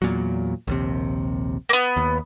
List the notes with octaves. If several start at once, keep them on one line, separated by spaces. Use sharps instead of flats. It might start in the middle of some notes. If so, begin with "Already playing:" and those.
E2 A#2 F#3
A#1 D#2 C3
A#3 B3
D#2